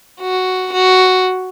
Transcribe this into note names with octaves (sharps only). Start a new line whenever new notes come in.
F#4
F#4